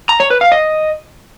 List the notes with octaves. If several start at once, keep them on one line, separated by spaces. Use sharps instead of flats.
A#5
C#5
B4
F5
D#5